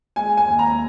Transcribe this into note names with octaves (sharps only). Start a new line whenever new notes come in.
G#3 G#5
G#5
D#2
A#5